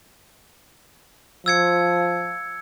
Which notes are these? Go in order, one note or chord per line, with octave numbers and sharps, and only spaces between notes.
F3 E6 G#6 C#7